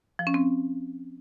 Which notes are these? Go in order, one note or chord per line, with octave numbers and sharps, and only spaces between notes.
F3
C#4
C4